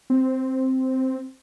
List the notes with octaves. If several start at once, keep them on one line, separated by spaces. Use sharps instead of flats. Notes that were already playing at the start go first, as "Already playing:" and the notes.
C4